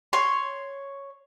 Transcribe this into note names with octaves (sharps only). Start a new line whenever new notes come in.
C#5 C6